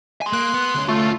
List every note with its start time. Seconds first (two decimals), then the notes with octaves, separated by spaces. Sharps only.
0.22 G#5 C6
0.33 A#3 F#6
0.54 B3
0.75 D2 C#4
0.89 A3 F4